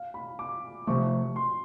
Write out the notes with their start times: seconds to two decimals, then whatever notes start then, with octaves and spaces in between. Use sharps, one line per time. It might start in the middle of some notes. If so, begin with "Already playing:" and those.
Already playing: F5
0.14 B5
0.39 D6
0.87 C3 F3 A3 C#6
1.36 C6